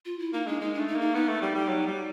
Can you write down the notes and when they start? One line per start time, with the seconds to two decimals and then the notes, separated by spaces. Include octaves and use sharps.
0.05 F4
0.19 E4
0.33 A#3 D#4
0.47 G#3 D4
0.61 G#3 D#4
0.74 A3 D4
0.88 D#4
0.96 A#3
1.01 D#4
1.14 B3 D#4
1.28 A3
1.42 G3
1.55 G3
1.68 F#3
1.87 G3